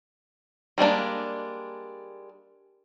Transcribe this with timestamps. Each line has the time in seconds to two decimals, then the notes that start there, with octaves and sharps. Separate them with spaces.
0.78 G3 G#3 A#3 D4